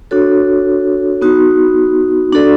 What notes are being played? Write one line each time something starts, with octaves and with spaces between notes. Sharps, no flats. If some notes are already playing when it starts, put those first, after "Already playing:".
D4 F#4 A4 C#5
B3 D#4 F#4
D4 F#4 A4 D5